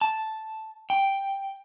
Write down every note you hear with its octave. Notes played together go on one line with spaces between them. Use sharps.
A5
G5